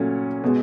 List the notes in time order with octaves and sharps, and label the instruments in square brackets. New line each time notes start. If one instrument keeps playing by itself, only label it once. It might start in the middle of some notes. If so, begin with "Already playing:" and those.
Already playing: [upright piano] A#2 F#3 A3 C#4
B2 G#3